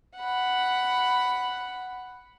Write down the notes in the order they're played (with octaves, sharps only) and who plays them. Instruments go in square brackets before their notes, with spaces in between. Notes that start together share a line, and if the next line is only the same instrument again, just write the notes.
[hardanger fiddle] F#5 B5